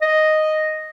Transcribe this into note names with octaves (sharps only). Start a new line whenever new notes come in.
D#5